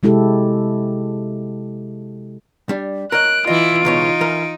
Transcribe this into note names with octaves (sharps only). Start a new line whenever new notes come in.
C3 G#3 E4 G4 A4
G3 D4
A#4 C#5 D#5 F#6 D7
E3 E4 F4 D#5
C#2 B2 D#4 C#5
E3 A#4